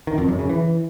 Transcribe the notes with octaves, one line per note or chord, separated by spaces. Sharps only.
D#3
F2
F#2
C#3
E3